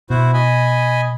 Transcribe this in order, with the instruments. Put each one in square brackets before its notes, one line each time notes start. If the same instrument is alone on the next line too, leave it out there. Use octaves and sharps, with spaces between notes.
[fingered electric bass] B2 [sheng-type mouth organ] E4 F#4 C5
[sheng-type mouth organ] D#5 G#5 B5